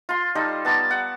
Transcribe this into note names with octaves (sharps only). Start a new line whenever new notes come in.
F4 C6
G3 D#4 A4
B3 A5 A#5 D6
F#5